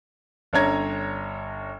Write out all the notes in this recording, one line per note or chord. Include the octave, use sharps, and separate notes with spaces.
G1 C#4 D4 C#5 A#5 G#6